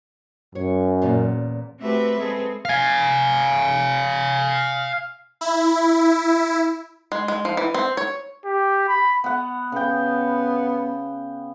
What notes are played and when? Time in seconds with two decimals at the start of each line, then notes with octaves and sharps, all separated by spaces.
0.55 F#2 C#5
1.02 E2 A#2 C#4
1.79 A3 C4 F#4 G4 B4 E5
2.19 G#3 C4 G#4 A4 B4
2.65 F5 G#5
5.41 E4
7.12 G#3
7.28 G#3
7.45 F3
7.57 E3
7.74 C4
7.97 C#5
8.45 G4
8.88 B5
9.24 B3 F#5
9.72 C#3 B3 G5